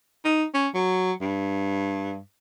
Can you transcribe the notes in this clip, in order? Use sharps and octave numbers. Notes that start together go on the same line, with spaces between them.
D#4
C#4
F#3
G2